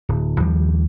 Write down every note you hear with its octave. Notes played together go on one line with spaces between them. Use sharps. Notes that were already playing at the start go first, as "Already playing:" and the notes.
D1
D#2 F3 G3